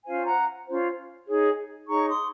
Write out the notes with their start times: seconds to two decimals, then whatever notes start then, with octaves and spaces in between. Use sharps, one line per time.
0.06 C#4 F4 C5 F5 G#5
0.26 F#5 A#5
0.67 C#4 F4 C5
1.28 D#4 G#4 C#5
1.88 D#4 G#4 C#5 A#5 C#6
2.08 C6 D#6